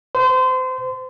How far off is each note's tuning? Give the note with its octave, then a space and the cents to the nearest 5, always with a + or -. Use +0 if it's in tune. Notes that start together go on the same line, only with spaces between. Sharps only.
C5 -30 C6 -30